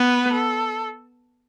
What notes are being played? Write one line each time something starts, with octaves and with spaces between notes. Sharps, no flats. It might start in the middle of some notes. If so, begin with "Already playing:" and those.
Already playing: B3 B4
A4